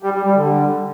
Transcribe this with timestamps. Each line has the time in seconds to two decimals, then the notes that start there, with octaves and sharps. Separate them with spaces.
0.03 G3
0.14 G3
0.25 G3
0.36 D3